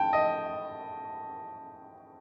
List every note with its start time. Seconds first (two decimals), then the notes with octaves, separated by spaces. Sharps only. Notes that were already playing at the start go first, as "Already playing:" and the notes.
Already playing: G5 A5
0.13 D#5